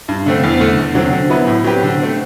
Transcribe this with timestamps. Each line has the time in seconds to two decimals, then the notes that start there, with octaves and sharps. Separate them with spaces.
0.08 G2
0.26 D3 A3 C4
0.43 E2
0.60 D3 A3
0.78 E2
0.95 D3 F#3 C4
1.13 D3
1.30 F#3 B3 E4 B4
1.47 A2
1.64 F#3 C4 G4 B4
1.83 D3
2.00 A3 C4